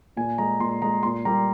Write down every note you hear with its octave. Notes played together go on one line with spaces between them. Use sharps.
A#2 G#5
G#3 A#5
A#2 C6
G#3 A#5
A#2 C6
G3 A#3 A#5